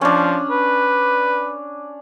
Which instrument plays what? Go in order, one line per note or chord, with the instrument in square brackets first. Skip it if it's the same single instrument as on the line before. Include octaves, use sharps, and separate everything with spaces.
[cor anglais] F3 [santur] C#4 D4
[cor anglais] B4